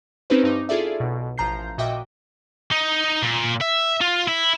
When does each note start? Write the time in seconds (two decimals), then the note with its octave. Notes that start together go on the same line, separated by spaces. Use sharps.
0.30 C4 C#4 D#4 G4 B4 C5
0.43 G2 D#4 D6
0.69 E4 F4 G#4 A4 D5 E5
1.00 B1 B2
1.38 A1 F3 A#5 G6 C7
1.78 A#2 F#4 D#5 E5 G5 D6
2.72 D#4
3.23 A#2
3.61 E5
4.01 F4
4.28 E4